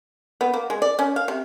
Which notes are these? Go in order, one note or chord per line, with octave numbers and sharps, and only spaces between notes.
B3
A#3
G#3
D5
C#4
F5
C3